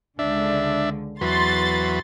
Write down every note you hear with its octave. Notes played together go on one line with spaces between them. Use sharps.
C#2 D3 D4 E5
E2 F#3 B4 C6 A6